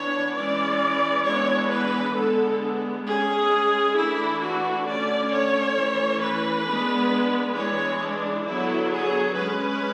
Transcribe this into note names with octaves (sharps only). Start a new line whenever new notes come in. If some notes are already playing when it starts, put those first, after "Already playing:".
Already playing: E3 B3 D4 C#5
E3 G#3 C#4 D5
E3 G#3 B3 D4 C#5
B4
D3 G#3 B3 A4
G#3 C#4 G#4
E3 A3 D4 E4
F#4
D3 A3 C#4 D5
C#5
E3 A3 C#4
B4
G#3 B3 D4
E3 G#3 D4 C#5
D4
D3 F#3 B3 E4
G#4
G#3 C#4 B4